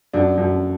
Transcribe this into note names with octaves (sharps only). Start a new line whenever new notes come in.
F#2 D4
F#2